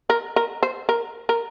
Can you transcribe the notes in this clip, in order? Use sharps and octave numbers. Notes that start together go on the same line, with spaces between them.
A#4
A#4
C5
A#4
A#4